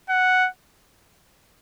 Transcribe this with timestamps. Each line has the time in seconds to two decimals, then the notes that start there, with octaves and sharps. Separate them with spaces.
0.09 F#5